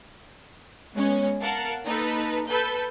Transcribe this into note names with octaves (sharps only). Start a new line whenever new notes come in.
G#3 B3 C#4
A#4 F5 F#5 A5
A#3 D#4 A4 B4
A4 B4 G6